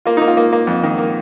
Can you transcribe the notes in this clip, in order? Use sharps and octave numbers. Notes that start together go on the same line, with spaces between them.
A#3 F4
A#3 D#4
F4
A#3
A#3
F2
D#3
A#3